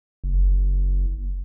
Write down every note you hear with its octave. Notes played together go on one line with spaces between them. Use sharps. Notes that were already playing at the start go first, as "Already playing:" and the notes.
F#1